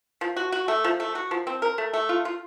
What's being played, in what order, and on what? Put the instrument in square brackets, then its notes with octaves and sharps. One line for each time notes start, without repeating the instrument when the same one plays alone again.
[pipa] F3
F#4
F#4
A3
F3
A3
F#4
F3
C4
A#4
A3
A3
F4
F4